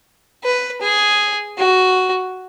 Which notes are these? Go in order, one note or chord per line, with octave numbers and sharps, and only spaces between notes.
B4
G#4
F#4